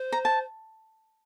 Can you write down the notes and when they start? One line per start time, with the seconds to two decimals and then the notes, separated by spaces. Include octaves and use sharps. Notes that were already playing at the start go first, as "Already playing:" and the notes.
Already playing: C5
0.12 A#5
0.25 A5